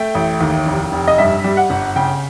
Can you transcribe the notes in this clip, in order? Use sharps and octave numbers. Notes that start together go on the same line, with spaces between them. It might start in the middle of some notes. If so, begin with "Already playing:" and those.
Already playing: A3 G5
A1
D#2
F1
F1
D#5
G2 E5
G3
F#5
G1
C#3 G5